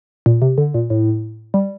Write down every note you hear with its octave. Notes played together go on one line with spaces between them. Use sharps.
A#2
C3
D3
A#2
A2
G3